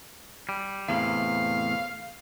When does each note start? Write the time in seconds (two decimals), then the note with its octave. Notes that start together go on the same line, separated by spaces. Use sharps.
0.49 G3
0.89 E2 A2 C3 F5